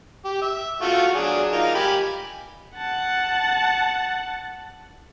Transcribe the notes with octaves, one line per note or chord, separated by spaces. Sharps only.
G4
E5
A3 F4 F#4
F#3 D4 G#4
D#4 F4 A#4
G4 G#5 B5
F#5 A5